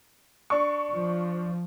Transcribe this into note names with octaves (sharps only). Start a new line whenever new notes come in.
D4 C#6
F3